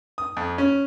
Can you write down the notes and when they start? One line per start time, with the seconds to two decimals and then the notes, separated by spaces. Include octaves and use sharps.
0.18 D#6
0.37 F2
0.58 C#4